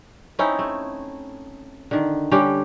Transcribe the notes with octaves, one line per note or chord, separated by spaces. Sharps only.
C4 C#4 D#4 E4
A3
D3 D#3
D3 G3 C#4 G4